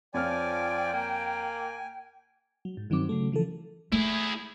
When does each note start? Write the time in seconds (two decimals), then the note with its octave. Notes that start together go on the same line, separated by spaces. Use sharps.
0.14 F2 F3 C#5 D5 G5 G#5 F6
0.93 A#3 G#5
2.65 F#3
2.77 G#2
2.90 G2 D#3 F#3 C4 D6
3.09 C#3 F#3 A3
3.32 C#3 E3 F3 A4
3.92 A3 E4 G#4